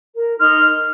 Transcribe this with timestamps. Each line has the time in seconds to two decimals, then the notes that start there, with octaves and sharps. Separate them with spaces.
0.14 A#4
0.39 D#4 C6 F6